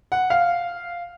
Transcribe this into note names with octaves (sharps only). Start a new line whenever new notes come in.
F#5
F5